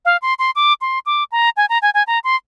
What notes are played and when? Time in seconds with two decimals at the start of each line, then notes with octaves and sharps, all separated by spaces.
0.05 F5
0.22 C6
0.39 C6
0.56 D6
0.81 C6
1.06 D6
1.32 A#5
1.57 G#5
1.69 A#5
1.82 G#5
1.94 G#5
2.07 A#5
2.24 C6